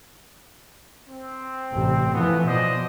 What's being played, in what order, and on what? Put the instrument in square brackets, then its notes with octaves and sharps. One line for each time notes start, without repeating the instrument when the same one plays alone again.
[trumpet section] C4
[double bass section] A1 C3
[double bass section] E3 F3 [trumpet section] A3 B3
[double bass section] B2 [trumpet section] C5 D5 D#5